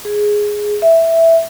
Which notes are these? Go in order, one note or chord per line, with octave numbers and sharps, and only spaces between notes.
G#4
E5